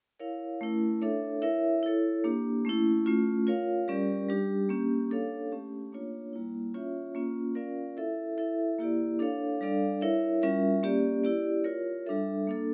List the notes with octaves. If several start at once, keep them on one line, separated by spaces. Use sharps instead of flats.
E4 A#4 C#5 F5
A3 C#4 E4 A#4
D4 A4 C#5 E5
E4 A#4 C#5 E5
E4 A4 C#5
A#3 D4 G4
A3 C#4 E4
A3 C#4 F4
F4 A#4 C#5 F5
G3 C#4 G4 A#4 D5
G3 D4 G4
A#3 C#4 G4
D4 A4 C#5 F5
A3 C#4 G4
A#3 D4 F4 C#5
G3 A#3 E4
C#4 F4 C#5 E5
A#3 C#4 F4
C#4 F4 A#4 D5 F5
E4 A4 E5
E4 A4 E5
A#3 E4 G4 D5
D4 A4 C#5 F5
G3 D4 A4 D5 F5
E4 A#4 C#5 E5
G3 C#4 F4 A#4 E5
A#3 C#4 G4 D5
E4 G4 D5
F4 A#4 C#5
G3 D4 A4 E5
A#3 D4 A4